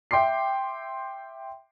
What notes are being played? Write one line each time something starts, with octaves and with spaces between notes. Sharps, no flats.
E5 G5 C6 D6 C7